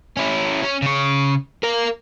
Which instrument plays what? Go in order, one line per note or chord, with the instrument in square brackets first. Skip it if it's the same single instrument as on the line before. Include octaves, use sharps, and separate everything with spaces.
[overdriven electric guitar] C#4 E4
C#4
C#3 C#5
A#4 F5